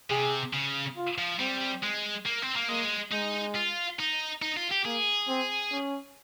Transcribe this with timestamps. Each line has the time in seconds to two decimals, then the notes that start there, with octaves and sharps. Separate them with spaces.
0.10 C3 G#4
0.53 C#3
0.97 F4
1.18 F3
1.40 G3 C4
1.83 G#3
2.26 A#3
2.42 C4
2.56 A#3
2.69 G#3 A#3
3.12 G#3 D#4
3.56 F4
3.99 D#4
4.42 D#4
4.57 F4
4.71 G4
4.85 A#3 G#4
5.28 C4
5.72 C#4